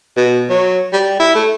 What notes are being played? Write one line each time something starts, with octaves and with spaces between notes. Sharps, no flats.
B2
F#3
G3
E4
A3